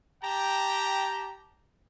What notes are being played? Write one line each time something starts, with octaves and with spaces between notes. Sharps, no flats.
G4 G5 A5 A#5